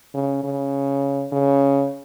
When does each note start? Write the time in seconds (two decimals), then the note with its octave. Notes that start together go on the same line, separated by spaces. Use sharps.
0.14 C#3
0.44 C#3
1.32 C#3